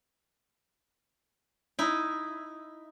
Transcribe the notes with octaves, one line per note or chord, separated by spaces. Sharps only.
D#4 E4